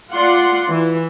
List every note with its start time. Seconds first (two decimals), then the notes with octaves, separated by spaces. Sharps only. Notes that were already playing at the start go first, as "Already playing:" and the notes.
0.13 F4 D5 F#5 C6
0.70 E3